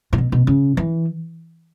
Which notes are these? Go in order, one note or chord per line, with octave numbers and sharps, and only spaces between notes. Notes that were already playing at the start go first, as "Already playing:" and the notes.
A2
B2
B2
C#3
E3